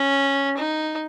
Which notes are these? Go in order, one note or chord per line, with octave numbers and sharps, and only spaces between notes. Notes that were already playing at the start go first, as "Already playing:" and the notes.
Already playing: C#4
D#4